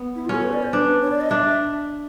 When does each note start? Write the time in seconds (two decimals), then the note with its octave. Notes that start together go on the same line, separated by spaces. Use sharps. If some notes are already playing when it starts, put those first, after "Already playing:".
Already playing: B3
0.15 E4
0.25 F4
0.29 C#4 A4
0.43 B4
0.53 D5
0.63 C5
0.73 D4 B4
1.02 C#5
1.11 D5
1.21 D#5
1.30 D4 E5